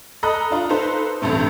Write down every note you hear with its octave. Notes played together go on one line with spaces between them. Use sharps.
A4 D#5 A#5 B5 D#6 F#6
D4 F4 A#5
D#4 A4 B4 C5
A1 D2 G2 C3 A3